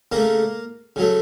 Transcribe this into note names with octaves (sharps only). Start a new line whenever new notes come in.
C#3 A3 A#3 A#4
C#3 F#3 A3